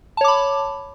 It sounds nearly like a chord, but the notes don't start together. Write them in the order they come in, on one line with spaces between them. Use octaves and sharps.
A5 C#5 D6 B5